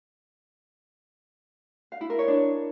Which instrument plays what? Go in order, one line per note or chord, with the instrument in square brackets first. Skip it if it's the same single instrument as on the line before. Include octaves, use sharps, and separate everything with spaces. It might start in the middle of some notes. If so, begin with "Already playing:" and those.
[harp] F5
E4
A#4
C#5
D4